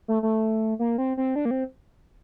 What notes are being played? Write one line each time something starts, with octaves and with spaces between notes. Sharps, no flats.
A3
A3
A#3
C4
C4
D4
A#3
C4